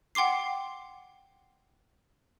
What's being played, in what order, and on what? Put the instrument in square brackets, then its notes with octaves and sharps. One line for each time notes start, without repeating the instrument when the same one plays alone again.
[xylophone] F#5 G5 C6 D6 C7